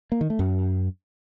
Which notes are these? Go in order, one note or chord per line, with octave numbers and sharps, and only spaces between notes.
A#3
D#3
A3
F#2